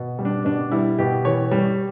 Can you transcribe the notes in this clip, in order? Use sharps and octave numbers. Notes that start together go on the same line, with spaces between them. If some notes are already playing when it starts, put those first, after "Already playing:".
Already playing: B2
G3
D4
B2 D4
G3 E4
B2 G4
E3 C#5
G3